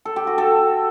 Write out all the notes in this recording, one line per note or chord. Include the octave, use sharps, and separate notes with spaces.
A4
G4
F#4
A4